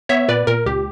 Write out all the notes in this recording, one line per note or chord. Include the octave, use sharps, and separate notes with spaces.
B3 C#5 E5
A#2 B4 D5
A#2 A#4
C#2 G4